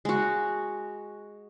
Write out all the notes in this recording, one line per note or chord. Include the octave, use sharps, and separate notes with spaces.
G#3 F#4